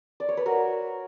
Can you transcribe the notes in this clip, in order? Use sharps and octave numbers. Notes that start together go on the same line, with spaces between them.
D5
C#5
B4
F#4 A#4